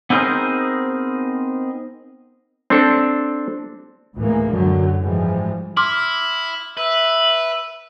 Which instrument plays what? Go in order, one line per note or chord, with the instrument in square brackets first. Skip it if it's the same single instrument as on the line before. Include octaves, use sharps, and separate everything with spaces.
[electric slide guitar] B3 C4 D#4 G#4 A#4 C5
[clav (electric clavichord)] C4 D4 A4
[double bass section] D2 A2 E3 G#3 A#3
F#2 D3 F#3
G#2 E3 F3 G3 G#3
[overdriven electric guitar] E4 [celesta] C6 D6 F6
[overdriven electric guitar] B4 [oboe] E5